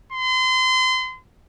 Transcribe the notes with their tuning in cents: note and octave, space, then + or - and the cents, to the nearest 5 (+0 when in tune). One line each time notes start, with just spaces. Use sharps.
C6 -30